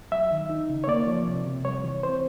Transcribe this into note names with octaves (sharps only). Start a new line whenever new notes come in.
F#3 E5
D#3
D#4
C#3
C#5
A#3 D5
F3
C3
C3
G3 C#5
E3
C4 C5